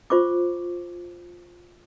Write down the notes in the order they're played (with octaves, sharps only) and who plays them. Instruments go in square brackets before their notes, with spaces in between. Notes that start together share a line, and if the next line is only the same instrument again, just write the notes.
[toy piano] F4 C5 C#6 D6